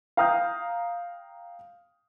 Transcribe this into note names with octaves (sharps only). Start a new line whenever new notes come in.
F5 G5 A#5 D#6 F6 G6